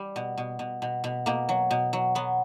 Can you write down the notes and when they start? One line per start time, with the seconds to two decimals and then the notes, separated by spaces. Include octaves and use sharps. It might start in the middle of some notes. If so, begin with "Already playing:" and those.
Already playing: G3
0.16 B2
0.38 B2
0.59 B2
0.82 B2
1.04 B2
1.26 B2 A#3
1.49 F#3
1.71 B2
1.93 F#3
2.15 F#3 B3